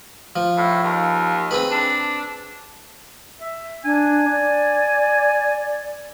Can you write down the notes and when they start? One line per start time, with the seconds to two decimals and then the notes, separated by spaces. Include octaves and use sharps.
0.36 F3
0.58 A2
0.84 D#2
1.51 C4 G#4 B4
1.71 D4
3.40 E5
3.85 D4 G#5
4.32 D5